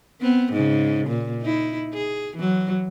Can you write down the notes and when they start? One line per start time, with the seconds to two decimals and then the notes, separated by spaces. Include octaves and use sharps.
0.21 B3 C4
0.52 G#2 C#3
1.07 A#2
1.41 D#4 E4
1.93 G#4
2.36 E3 F#3